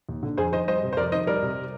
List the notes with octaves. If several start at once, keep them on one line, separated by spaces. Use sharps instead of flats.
D#2
D3
F2 G#4 C5
D#3 C5 D#5
G3 C5 D#5
C3
C5
F2 A#4 D5
D#3 C5 D#5
G3 A#4 D5
C3